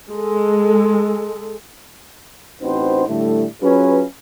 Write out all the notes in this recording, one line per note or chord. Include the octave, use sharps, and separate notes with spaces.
G#3 A4
A1 C4 D#4 F#4 B4 C5
A2 D3 G3 A3
F#3 C#4 F4 G#4 B4